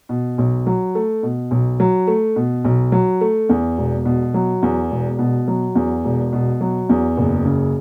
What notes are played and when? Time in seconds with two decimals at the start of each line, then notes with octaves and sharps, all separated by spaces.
0.09 B2
0.38 B1
0.67 F#3
0.95 A3
1.23 B2
1.51 B1
1.80 F#3
2.07 A3
2.36 B2
2.65 B1
2.92 F#3
3.21 A3
3.49 E2
3.78 E1
4.05 B2
4.34 F#3
4.62 E2
4.91 E1
5.19 B2
5.48 F#3
5.75 E2
6.04 E1
6.33 B2
6.61 F#3
6.89 E2
7.17 F#1
7.45 C#3